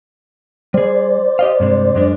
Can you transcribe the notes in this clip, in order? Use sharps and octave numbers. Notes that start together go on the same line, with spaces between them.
G3 G#4 C5 D5
G4 D#5 F5
G2 C3 G#3
F#2 G#3 D4